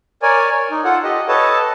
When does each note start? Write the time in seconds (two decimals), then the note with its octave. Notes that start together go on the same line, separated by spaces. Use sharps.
0.23 A#4 C#5 D5 G#5
0.52 C#5
0.71 D#4
0.85 F4 A4 F#5
1.04 G4 D#5
1.28 A4 B4 C#5 D#5 A5